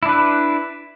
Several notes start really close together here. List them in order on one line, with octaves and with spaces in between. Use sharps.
E4 D4 B4